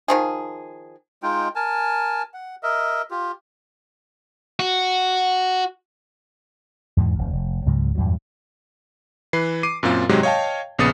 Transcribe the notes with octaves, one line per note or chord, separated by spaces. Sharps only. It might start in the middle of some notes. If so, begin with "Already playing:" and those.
D#3 F3 G#4
G#3 D#4 F4 G5
A#4 G#5 A5
F#5
A#4 D#5 E5
F4 G4
F#4
E2 G#2 B2 E3
E1 D2
F1
C#2 G#2 C#3 F#3
E2 G2 A#2 F#3
E3 B4 C7
D6 C7 D#7
F#2 A#2 C4 F4
G#2 C3 F#3 G#3 G4
C#5 D#5 F5 G5 A5
A#1 C#3 B3 D#6 A6 C#7